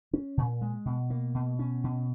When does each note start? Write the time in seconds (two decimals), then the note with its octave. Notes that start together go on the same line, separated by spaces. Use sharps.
0.13 C#4
0.37 A#2
0.61 G#3
0.86 B2
1.10 A#3
1.35 B2
1.59 C#4
1.84 B2